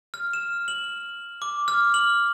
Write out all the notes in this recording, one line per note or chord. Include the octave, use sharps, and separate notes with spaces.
F6
E7
F#7
D6
F6
F#7